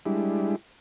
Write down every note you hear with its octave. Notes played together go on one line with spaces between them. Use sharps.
G3 G#3 D4 E4